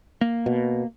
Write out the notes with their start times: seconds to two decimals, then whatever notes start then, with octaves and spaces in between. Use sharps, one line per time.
0.21 A#3
0.46 B2